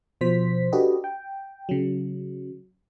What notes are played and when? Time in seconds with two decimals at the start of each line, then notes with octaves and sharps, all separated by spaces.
0.21 B2 F3 C5 B6
0.72 D4 F#4 G4 A4 B4 D#5
1.04 G5
1.69 C#3 F#3